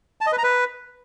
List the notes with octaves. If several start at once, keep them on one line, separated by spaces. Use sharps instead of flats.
A5
D#5
B4
A#5
B4